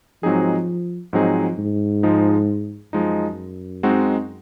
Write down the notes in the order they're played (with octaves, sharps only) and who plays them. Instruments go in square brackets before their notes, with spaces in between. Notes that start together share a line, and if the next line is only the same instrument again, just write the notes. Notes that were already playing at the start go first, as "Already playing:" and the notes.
[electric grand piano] G#2 F#3 C4 D#4 G#4 [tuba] F3
[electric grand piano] G#2 F#3 C4 D#4 G#4 [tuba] F3
[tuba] G#2
[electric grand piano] F3 G#3 D#4
[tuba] F#2 [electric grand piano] F3 G#3 D#4
[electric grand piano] G#3 C4 D#4 F#4